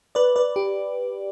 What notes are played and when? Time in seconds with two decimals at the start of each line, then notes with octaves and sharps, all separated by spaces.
0.15 B4 D5
0.36 B4 D5
0.56 G4